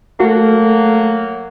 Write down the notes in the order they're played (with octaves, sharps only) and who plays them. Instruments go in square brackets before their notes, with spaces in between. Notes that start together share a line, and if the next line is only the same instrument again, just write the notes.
[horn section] F#3 A#3 [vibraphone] A3 A4 [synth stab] F#4